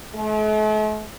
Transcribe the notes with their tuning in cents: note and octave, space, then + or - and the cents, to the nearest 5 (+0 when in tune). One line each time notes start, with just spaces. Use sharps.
A3 -45